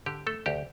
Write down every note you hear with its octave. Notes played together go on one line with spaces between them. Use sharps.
D3 G4
A3 A4
D2 G4